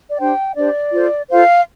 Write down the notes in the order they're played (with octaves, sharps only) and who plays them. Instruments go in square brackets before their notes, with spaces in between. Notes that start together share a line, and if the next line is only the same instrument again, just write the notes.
[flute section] D5
D4 G4 C5 G5
D4 G4 C5 D5
F4 A4 C5
F4 A4 C5 F5